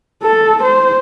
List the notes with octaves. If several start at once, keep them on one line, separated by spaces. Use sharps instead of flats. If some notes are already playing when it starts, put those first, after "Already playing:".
A4
C5